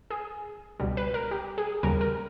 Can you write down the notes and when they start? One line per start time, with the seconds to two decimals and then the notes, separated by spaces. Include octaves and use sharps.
0.10 G#4
0.80 C#2 B2 G3
0.97 B4
1.14 A#4
1.31 G4
1.58 G#4
1.83 D#2 C#3 G3 A#4
2.01 A#4